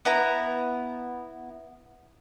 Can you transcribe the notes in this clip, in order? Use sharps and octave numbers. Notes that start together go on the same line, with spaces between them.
B3 E4 A#5